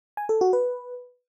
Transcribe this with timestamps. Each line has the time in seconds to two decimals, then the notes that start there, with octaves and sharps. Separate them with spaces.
0.17 G#5
0.29 A4
0.41 F#4
0.53 B4